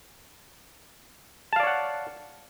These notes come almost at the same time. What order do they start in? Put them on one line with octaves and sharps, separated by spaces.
A5 F5 D5 C#5 F#5